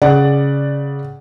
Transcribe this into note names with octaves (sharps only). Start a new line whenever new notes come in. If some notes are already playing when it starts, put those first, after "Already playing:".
C#3 D5 F#5